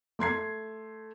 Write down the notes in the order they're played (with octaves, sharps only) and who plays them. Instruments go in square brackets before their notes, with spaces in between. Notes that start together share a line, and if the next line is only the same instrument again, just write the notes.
[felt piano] A3 C6 G#6 C7